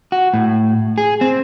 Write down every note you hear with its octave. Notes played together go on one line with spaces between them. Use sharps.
F#4
A2
G#4
C4